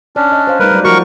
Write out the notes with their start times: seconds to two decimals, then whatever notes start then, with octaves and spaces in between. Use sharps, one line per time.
0.16 C#4 D4 D5
0.32 D#5
0.47 C5 F5
0.59 G3 A3 D#4 A#4 B4
0.71 F#3 D5
0.84 F3 A3 F#4 A#4 C#6